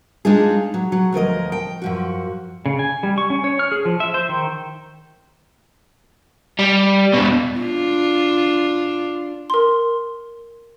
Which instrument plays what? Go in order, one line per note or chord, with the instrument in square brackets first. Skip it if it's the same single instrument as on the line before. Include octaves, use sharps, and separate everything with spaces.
[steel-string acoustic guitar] G#3 D4 D#4 F4 G#4
F#3
F#3
D2 F3 A#4 D#5
G5
F#2 F3 F#4
[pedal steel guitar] C#3
G#5
G3
C#6
C#4
C#5
F6
G#4
F3
E5
C5
D#3
[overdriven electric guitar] G3
E2 B2
[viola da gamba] D4 F4
[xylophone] A#4 C6